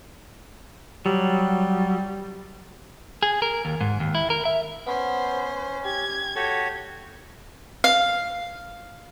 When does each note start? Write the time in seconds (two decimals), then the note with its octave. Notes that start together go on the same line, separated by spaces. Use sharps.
1.06 F#3 G3
3.23 G#4
3.42 A#4
3.65 D#2
3.81 G#2
4.00 D#2
4.15 E4
4.30 A#4
4.45 E5
4.87 B3 C#4 C5
5.85 G4 G#6
6.36 F#4 G4 A4 C#5
7.84 F5